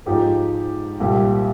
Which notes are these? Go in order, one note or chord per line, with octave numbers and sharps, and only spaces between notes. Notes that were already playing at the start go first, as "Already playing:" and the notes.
G#2 F3 G#3 D#4 G4
C2 A#2 G3 C4